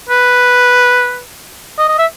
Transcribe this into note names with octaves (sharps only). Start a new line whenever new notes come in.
B4
D#5
D#5
E5